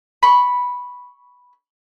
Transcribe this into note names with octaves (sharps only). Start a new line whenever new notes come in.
B5 C#6